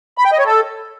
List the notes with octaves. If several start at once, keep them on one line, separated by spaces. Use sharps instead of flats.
B5
G5
D#5
C#5
A4